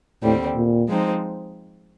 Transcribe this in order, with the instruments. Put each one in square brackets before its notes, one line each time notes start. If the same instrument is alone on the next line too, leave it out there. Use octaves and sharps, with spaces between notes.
[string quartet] D#2 D3 G3 C4 [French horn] A2
[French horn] A#2
[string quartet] F3 G#3 C4 D#4